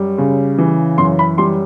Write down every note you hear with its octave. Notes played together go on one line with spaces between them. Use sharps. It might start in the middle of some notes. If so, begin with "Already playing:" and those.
Already playing: F#2 G3
C#3
E3
F#2 C6
B5
G3 C6